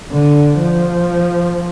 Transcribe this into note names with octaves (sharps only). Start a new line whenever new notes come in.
D3
F3